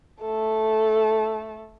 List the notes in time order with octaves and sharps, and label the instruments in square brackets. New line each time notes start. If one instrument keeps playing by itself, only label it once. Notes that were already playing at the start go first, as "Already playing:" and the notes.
[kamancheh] A3 A4